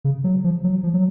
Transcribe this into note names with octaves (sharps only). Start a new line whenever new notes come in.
C#3
F#3
F3
F#3
F3
F#3